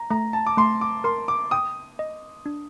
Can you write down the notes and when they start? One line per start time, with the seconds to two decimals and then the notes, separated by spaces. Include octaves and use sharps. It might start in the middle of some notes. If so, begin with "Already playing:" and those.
Already playing: A#5
0.10 A3 A#5
0.33 A5
0.46 D6
0.57 A3 C6
0.81 D6
1.04 A#4 C6
1.28 D6
1.51 G5 D#6
1.99 D#5
2.46 D4